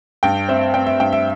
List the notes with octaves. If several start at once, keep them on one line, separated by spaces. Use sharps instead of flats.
G2 G5
C4 E5
C4 G5
E5
G2 G5
E5